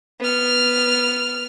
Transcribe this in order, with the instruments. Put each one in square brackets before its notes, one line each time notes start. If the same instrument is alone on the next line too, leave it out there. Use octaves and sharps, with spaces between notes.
[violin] B3 F6